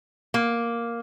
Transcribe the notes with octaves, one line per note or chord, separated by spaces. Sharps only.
A#3